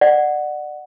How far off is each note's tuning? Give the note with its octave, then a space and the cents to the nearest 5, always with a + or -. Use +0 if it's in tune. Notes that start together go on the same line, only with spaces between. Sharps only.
D5 +30 F#5 +0